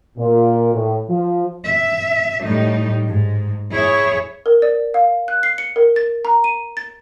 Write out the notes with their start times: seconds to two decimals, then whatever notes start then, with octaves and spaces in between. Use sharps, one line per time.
0.18 A#2
0.74 A2
1.09 F3
1.66 E5
2.44 A2 G3 D#4
3.07 G#2
3.71 E4 G#4 C#5 E5
4.46 A#4
4.62 D5
4.94 F5
5.28 F#6
5.43 C7
5.58 C#7
5.76 A#4
5.96 A6
6.25 A#5
6.44 D#7
6.77 A6